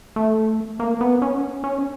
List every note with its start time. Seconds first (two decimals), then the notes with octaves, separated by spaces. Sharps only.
0.16 A3
0.80 A#3
1.01 B3
1.22 C#4
1.64 C#4